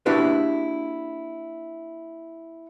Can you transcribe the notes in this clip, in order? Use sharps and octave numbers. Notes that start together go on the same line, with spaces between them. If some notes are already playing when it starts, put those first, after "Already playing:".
A#3 D4 E4 F#4 G4 B4